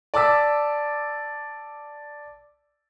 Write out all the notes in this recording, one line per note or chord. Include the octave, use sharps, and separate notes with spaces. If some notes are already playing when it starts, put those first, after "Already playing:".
D5 A5 D6 E6 B6